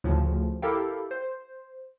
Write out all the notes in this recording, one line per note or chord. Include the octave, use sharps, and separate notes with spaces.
D2 A2 C#3 F3
E4 G4 A4 A#4 F5 G5
C5